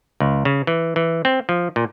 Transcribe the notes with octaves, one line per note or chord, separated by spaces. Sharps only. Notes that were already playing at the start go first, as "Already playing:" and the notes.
C#2
C#3
E3
E3
C4
F3
A#2